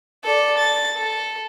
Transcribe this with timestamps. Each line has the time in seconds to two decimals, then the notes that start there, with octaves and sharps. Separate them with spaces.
0.25 A4 D5
0.58 A6
0.97 A4